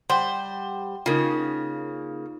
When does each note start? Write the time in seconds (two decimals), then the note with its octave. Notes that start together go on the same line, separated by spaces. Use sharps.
0.09 G3 C5 F#5 G5
1.06 C#3 A#3 D#4 F4